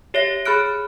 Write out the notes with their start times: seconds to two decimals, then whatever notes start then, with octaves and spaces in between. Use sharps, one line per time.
0.14 G4 C#5 E5 A#6
0.45 G#4 B5 F6 F#6 D7